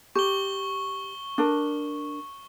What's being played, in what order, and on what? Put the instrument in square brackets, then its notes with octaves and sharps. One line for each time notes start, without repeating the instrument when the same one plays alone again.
[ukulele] G4 [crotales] C#6 G7
[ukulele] D4 A#4